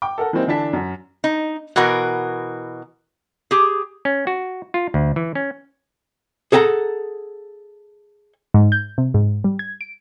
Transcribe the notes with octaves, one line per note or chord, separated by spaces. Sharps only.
G5 D6
A4 A#4 F#5
E3 G3 A#3 C4 D#4
D3 E3 D4 A5 B6
F#2
D#4
B2 E3 F#4 A#4
G4 G#4
C#4
F#4
F4
D2
E3
C#4
G#4 A4 F#5 G5 A#5
G#2
G6
C3
G#2
G3
G#6
D7